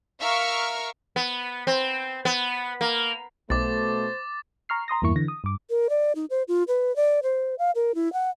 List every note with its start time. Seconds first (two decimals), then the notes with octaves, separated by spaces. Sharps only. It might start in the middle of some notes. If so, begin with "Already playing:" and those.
0.20 A#4 E5 F5 C#6 F6
1.16 B3
1.67 C4
2.25 B3
2.81 A#3
3.50 B1 B2 A3 C5 D6 A6
4.69 A#5 C#6 F6 C7
4.88 A#5 C6 D#6 A#6
5.02 E2 G2 A#3 E4 C#6 C#7
5.16 D3 E3 A#6
5.28 D#6
5.44 G2 D6
5.70 A#4
5.90 D5
6.15 D#4
6.30 C5
6.48 F4
6.68 B4
6.96 D5
7.23 C5
7.59 F5
7.75 A#4
7.95 E4
8.13 F#5